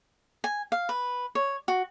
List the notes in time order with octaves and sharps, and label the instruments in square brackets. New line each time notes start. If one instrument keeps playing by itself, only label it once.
[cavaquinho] G#5
F5
B4
C#5
F#4